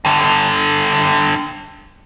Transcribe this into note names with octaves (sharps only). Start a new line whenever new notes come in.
G2 D3